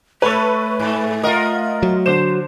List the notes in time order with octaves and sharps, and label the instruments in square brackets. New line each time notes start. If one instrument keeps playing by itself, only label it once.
[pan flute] A3 [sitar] A4 C#5 [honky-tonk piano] B4 C#6
[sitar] G#2 A4
[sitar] F4 A#4 [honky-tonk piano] D#5 F#5
[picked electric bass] F#3
[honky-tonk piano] D3 E7 [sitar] C5